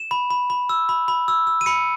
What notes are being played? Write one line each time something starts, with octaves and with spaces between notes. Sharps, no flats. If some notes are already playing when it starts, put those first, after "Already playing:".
Already playing: E7
B5
B5
B5
E6
B5
B5
E6
E6
D#7
B5 C#7